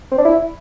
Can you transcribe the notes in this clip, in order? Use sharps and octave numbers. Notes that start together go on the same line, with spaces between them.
C4
D4
E4